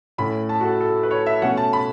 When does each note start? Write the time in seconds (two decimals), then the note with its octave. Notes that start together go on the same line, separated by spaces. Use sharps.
0.18 A2 A3 C#4 B5
0.49 A5
0.61 F#4
0.64 A4
0.81 A4
1.03 B4
1.11 C#5
1.26 E5
1.42 B2 A3 C#4 F#5
1.57 A5
1.73 B5